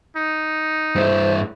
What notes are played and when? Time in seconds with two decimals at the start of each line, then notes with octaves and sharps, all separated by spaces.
0.17 D#4
0.95 G2 E4 C5